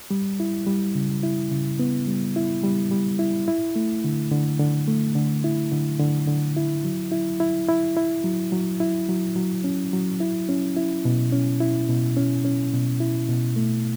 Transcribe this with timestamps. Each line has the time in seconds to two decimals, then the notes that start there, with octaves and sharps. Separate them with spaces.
0.11 G3
0.40 E4
0.67 G3
0.95 C#3
1.23 E4
1.52 C#3
1.80 B3
2.08 G3
2.36 E4
2.63 G3
2.91 G3
3.19 E4
3.48 E4
3.76 A3
4.04 D3
4.31 D3
4.59 D3
4.88 A3
5.15 D3
5.44 E4
5.72 D3
5.99 D3
6.27 D3
6.57 E4
6.84 F#3
7.12 E4
7.40 E4
7.69 E4
7.97 E4
8.24 F#3
8.52 F#3
8.80 E4
9.09 F#3
9.36 F#3
9.64 C#4
9.93 F#3
10.20 E4
10.49 C#4
10.77 E4
11.05 B2
11.33 C#4
11.61 E4
11.89 B2
12.17 C#4
12.45 C#4
12.73 B2
13.00 E4
13.29 B2
13.56 A3